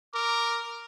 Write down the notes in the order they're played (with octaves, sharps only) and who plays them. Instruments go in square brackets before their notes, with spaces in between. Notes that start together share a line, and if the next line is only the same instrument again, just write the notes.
[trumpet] A#4 [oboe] D6